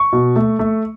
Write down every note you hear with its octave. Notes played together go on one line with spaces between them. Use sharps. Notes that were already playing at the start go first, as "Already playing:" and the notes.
Already playing: C#6
B2
A3
A3